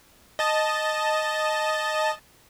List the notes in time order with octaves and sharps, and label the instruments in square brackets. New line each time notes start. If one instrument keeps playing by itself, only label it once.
[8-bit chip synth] D#5 A5